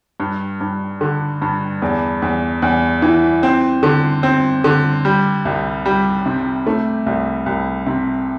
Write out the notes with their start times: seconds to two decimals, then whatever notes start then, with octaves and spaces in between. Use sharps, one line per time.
0.20 G2
0.61 G2
1.01 D3
1.42 G2
1.82 E2
2.22 E2
2.62 E2
3.02 E3
3.43 C4
3.83 D3
4.23 C4
4.64 D3
5.05 G3
5.45 C2
5.86 G3
6.26 C3
6.67 A3
7.06 C2
7.46 C2
7.86 C3